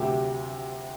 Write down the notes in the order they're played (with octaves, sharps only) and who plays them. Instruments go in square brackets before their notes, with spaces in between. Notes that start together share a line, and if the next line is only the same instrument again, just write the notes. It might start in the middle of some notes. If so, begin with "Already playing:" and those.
Already playing: [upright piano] D2 C3 F#3 G4